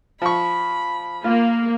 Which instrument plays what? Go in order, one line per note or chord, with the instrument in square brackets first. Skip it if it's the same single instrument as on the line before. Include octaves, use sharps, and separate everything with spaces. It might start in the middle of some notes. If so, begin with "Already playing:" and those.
[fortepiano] F3 C#6 [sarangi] B5
[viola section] A#3 [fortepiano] F4